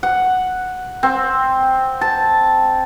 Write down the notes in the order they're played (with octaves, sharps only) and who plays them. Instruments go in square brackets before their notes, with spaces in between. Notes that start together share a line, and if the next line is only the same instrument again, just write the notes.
[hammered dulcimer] F#5
C4
A5